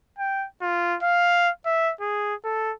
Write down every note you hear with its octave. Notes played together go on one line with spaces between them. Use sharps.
G5
F4
F5
E5
G#4
A4